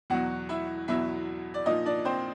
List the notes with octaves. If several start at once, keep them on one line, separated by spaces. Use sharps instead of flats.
E2 B2 F#3 F#4 F#5
E4 E5
E2 B2 F#3 E4 E5
D5
A#2 F3 D#4 D#5
D4 D5
C4 C5